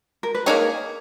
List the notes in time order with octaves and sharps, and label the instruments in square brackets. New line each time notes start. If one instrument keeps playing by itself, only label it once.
[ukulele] A#4
B4
[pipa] A#3 D#4 G#4 [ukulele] C#5